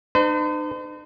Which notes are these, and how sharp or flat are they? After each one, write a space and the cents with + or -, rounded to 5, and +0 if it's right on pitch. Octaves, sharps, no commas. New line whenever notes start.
D#4 -45 C5 -45